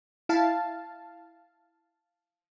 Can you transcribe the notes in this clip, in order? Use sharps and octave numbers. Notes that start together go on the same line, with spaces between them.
E4 F5 A5